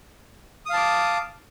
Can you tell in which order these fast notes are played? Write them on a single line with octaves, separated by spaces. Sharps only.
D#6 F5 A5 D6